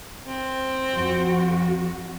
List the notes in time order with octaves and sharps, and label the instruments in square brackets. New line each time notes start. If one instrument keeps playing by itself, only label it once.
[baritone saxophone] C4
[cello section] F2 F#4